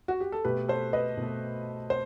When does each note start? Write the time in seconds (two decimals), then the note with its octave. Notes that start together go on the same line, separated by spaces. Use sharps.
0.08 F#4
0.20 G4
0.32 A4
0.45 B2 A3 G4 B4
0.68 A4 C5
0.93 B4 D#5
1.17 B2
1.22 A3
1.90 C5